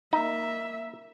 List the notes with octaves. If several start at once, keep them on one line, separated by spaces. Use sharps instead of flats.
A#3 D#4 E5